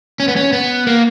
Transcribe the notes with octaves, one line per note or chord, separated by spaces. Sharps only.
C#4
B3
C#4
B3
A#3